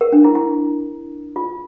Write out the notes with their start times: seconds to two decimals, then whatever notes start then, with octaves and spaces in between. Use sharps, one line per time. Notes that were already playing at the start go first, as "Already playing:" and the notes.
0.01 A#4
0.13 D4
0.24 E4
0.35 E4
1.36 F4